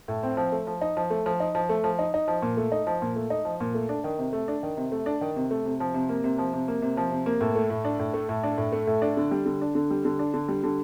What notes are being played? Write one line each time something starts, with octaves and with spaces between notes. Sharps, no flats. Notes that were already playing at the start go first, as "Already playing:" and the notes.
A2
C4
F3
A3
F3
D#4
F3
A3
F3
D#4
F3
A3
F3
D#4
D#4
F3
A#2
A3
D#4
F3
A#2
A3
D#4
F3
A#2
A3
D4
D#3
C3
A3
D4
D#3
C3
A3
D4
D#3
C3
A3
C3
F3
C3
A#3
C3
F3
C3
A#3
C3
F3
C3
A#3
A2
A3
A2
D4
A2
A3
A2
D4
A2
A3
A2
D4
D3
G3
D3
D4
D3
G3
D3
D4
D3
G3
D3